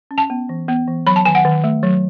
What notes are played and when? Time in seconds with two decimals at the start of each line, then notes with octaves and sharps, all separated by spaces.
0.11 C#4
0.18 A5
0.30 B3
0.49 E3
0.68 B3
0.88 E3
1.07 F#3 B5
1.16 A5
1.25 D#3 G#5
1.35 F#5
1.45 D#3
1.64 A3
1.83 F#3